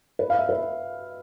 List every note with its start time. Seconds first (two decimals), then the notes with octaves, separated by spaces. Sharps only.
0.19 B4
0.30 F5
0.39 E5
0.49 B4